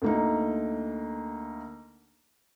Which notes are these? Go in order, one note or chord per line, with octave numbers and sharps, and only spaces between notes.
D2 A#3 D#4